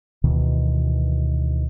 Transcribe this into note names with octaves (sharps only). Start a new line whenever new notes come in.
D2 B2 D#3 E3